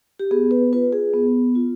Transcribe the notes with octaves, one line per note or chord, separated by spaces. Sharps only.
G4
B3 G#4
B4
F4 B4
G#4
B3
F4